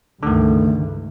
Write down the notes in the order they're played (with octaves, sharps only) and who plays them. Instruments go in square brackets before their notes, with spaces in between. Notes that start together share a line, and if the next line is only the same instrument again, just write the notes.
[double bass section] C#2 G2 [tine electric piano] D3 D#3 [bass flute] A3